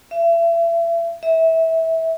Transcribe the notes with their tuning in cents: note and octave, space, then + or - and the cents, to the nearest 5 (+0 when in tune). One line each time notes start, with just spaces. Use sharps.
E5 +35
E5 -20